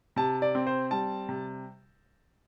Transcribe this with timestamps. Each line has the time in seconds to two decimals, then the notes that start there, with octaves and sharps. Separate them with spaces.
0.16 C3 A5
0.42 D5
0.55 C4
0.67 C5
0.91 G3 A5
1.29 C3